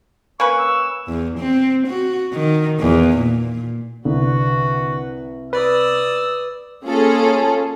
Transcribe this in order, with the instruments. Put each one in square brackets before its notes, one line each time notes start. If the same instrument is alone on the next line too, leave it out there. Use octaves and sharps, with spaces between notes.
[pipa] A#3 C#4 B4 [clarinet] C#6
[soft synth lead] E6
[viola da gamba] E2
C4
F#4
D#3
E2
A#2
[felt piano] C2 [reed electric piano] D3 [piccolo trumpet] F#4 [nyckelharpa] B4
[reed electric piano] B4 [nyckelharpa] D5 D#6 [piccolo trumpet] E6
[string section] A#3 C#4 F4 G#4 A4